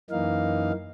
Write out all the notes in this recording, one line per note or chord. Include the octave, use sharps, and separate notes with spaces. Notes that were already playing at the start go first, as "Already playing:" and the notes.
F#2 E3 A#3 D#4 F5